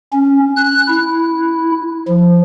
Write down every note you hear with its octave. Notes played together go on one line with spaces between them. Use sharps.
C#4
F#6
E4
F3